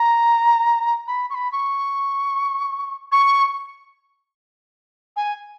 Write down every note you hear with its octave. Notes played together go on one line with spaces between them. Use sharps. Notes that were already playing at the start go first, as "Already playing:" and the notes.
Already playing: A#5
B5
C#6
B5
C#6
C#6
G#5